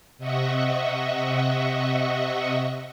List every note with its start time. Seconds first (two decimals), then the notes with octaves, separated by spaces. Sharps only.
0.18 C3 D#5 E5 F#5 C#6